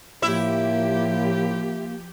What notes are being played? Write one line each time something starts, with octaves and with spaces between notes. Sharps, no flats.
A2 F3 A#3 E4 G4 E5